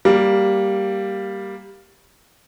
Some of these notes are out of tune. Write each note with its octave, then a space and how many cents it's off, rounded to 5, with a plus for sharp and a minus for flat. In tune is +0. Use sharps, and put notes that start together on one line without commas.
G3 +0 A#3 +0